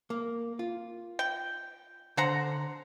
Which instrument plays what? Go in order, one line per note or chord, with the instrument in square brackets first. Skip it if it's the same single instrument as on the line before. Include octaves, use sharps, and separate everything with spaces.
[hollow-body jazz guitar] A#3
F4
[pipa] G5
[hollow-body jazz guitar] D3 [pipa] C5 F#5 A#5